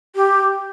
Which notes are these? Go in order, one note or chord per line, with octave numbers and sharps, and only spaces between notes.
G4